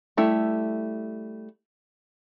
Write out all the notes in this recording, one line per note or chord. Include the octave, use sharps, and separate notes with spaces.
G3 A3 E4 G4